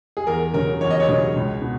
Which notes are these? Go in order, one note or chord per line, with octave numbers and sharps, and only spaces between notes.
G#4
E2 A#4
C#3 F#3 A#4
E2 C#5
D#5
C#5
C#3 F#3
C#2
B2